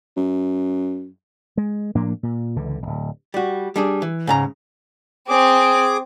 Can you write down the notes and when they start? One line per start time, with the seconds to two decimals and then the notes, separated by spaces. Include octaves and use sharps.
0.17 F#2
1.57 G#3
1.95 A2 F3 A#3 D4
2.23 A#2
2.56 C#2 D3 E3
2.82 D1 A#1
3.34 G3 F#4
3.76 G3 D4 G#4
4.02 E3
4.27 G#2 C#3 A#5
5.29 C4 G#4 D6